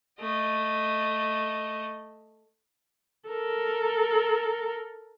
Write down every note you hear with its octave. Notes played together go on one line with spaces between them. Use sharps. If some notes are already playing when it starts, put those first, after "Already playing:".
A3 D#5
A4 A#4